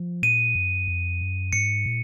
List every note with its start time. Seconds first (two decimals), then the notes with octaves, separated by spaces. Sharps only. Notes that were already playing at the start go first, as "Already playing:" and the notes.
Already playing: F3
0.23 A#2 D#7
0.55 F#2
0.88 F2
1.21 F#2
1.53 G#2 C#7
1.86 A#2